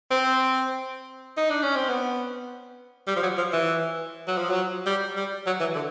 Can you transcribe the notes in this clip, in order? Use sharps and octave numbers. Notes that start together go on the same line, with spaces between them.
C4
D#4
D4
C#4
C4
B3
G3
F3
F#3
F3
E3
F#3
F3
F#3
G3
G3
F#3
E3
D3